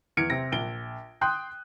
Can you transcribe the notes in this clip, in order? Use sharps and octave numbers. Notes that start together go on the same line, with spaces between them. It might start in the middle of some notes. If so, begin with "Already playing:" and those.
E2 F6 G#6 C#7 D7
C3 C4 A#6
A#1 D7 G7
G5 C6 D#6 F#6 G6